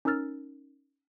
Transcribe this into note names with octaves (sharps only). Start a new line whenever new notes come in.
C#4 D#4 A#4 E6 F6 A6